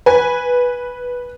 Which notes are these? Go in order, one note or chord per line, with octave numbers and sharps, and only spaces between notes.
B4 G#5